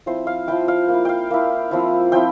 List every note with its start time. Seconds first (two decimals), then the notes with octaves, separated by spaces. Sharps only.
0.06 F3 C4 E4 C5
0.27 F5
0.48 F3 C4 E4 G5
0.68 F5
0.88 A#3
0.94 E4
1.05 F5 G5
1.31 A#3 E4
1.71 F3 C4 E4
2.12 F3 C4 E4 G5